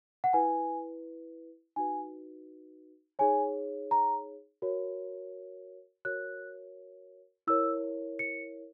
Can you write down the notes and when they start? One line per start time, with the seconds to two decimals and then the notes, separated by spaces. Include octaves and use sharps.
0.24 F#5
0.33 E4 B4 G#5
1.76 D#4 F#4 B4 G#5
3.19 D#4 G#4 C#5 G#5
3.91 A#5
4.62 F#4 A#4 C#5
6.05 F#4 A#4 C#5 F#6
7.47 E4 A#4 C#5 E6
8.19 C#7